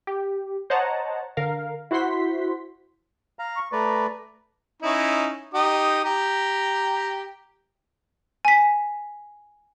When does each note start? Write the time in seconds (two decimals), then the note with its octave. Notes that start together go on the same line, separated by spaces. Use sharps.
0.07 G4
0.70 C5 C#5 D#5 F#5 A5 A#5
1.37 D3 A#4 F5
1.91 E4 F#4 C5 F#5 C6 B6
3.39 F5 A#5
3.56 C#6
3.72 A3 B4 D5 A#5
4.82 C#4 D#4 E4
5.54 D#4 G4 D#6
6.04 G4 A#5
8.45 G#5 B6